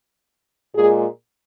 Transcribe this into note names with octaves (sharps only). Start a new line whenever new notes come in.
A#2 G#3 G#4